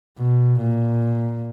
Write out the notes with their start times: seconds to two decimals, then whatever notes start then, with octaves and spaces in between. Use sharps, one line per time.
0.20 B2
0.61 A#2